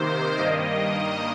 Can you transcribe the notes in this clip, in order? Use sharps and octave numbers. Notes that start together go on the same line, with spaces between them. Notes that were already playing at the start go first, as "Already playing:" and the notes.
Already playing: C3 D#3 A#3 C5
G2 D#3 A#3 D#5